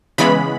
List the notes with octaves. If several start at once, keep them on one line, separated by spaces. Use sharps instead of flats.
C#3 E3 G#3 B3 B5